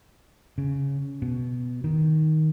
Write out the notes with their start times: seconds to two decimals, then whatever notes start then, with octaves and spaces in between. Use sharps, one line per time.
0.58 C#3
1.22 B2
1.84 D#3